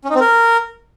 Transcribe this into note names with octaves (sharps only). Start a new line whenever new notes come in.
C#4
D#4
C4
A#4